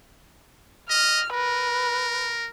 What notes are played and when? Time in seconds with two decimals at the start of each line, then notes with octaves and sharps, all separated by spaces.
0.90 D#5 F6
1.34 A#4 B4